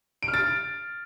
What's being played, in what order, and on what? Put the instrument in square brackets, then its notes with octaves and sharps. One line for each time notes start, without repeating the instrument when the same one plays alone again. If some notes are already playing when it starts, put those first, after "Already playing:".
[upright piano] D7
F6
A6